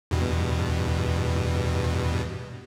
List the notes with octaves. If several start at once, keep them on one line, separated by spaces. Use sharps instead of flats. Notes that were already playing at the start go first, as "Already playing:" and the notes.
E2 G2 B2